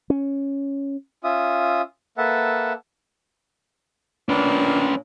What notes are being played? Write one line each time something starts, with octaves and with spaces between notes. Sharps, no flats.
C#4
C#4 F4 E5 D#6
A#3 A4 B4 E5 F#5 A5
A#2 C#4 D4 B4